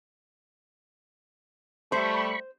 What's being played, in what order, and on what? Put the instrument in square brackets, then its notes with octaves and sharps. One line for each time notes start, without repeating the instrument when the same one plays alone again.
[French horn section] G3 A3 [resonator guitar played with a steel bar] C5 [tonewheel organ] B5 C#6